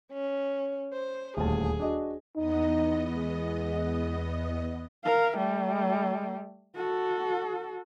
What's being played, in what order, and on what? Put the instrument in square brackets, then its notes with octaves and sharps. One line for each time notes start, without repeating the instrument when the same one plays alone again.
[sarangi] C#4
C5
[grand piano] D#1 D2 A5 [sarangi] G#4
[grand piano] D4 F#4 D#5
[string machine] E2 B3 D#5 [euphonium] D#4
[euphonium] G#3
[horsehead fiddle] A#4 F5
G3 A3
F#4 A4